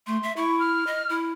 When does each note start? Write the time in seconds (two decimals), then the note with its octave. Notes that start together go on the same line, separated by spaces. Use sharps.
0.07 A3 C6
0.23 E5
0.37 E4 C#6
0.60 F6
0.87 D#5
1.09 E4